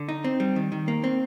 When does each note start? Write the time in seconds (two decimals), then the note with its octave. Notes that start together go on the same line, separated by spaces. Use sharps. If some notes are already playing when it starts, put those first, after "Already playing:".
Already playing: D3
0.09 D#4
0.24 C4
0.40 G3
0.56 D#3
0.72 D#3
0.88 A#3
1.04 C4